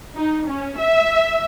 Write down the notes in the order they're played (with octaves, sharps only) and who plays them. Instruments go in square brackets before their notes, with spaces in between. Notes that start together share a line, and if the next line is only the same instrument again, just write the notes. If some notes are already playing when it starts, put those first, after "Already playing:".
[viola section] D#4
C#4
E5